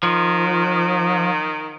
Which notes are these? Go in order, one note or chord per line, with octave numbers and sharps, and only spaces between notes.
D#3 F3